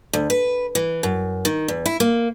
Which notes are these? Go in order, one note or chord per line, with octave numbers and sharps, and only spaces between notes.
D2
B4
E3
F#2
D#3
E2
E4
A#3